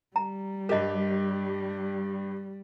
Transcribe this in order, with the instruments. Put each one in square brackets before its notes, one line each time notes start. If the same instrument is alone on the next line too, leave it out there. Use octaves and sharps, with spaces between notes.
[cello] G3 [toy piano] A#5
[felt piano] G2 G4 [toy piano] A#4 D#5